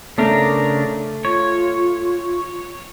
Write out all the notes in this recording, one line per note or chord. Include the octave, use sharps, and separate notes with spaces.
C#3 A3 D4 A#4
F4 C#5